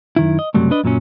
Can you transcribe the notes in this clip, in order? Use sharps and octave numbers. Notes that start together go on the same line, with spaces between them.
F#2 D#3 E4
D#5
C#2 F#2 C3 F#3 G3 A3
D4 B4 D#5
F#2 A#2 F#3 C#4